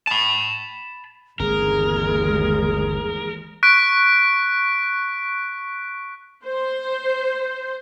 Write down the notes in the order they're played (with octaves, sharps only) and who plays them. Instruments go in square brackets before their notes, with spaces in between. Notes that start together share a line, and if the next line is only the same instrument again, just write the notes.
[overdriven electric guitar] A5 B5
[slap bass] G1 C4 [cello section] D#2 E3 G#3 [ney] G#4 [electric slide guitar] A#4
[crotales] C#6 F#6 B6 D7
[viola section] C5